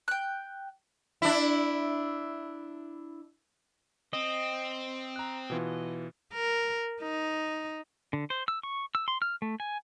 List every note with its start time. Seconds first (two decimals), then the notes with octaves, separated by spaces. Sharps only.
0.08 G5 F#6
1.22 D4 E4
4.13 C4 D#5
5.16 A#5 F#6
5.50 B2 E3 F4
6.34 A#4
7.02 D#4
8.13 D3
8.30 C5
8.48 E6
8.63 C#6
8.95 E6
9.08 C6
9.22 F6
9.42 A3
9.60 G#5